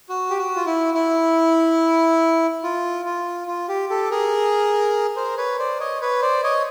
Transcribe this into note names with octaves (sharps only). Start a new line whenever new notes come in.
F#4
G4
F#4
F4
E4
E4
F4
F4
F4
G4
G4 A4
G#4 A#4
A#4 C5
B4 C#5
C5 D5
C#5 D#5
B4 C#5
C5 D5
C#5 D#5